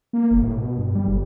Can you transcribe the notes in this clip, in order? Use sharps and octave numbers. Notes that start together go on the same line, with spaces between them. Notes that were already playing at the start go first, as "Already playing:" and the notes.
A#3
G1
A2
B2
G2
G3
G1